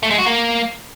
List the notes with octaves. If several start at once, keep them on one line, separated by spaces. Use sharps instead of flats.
A3
G#3
F#4
A#3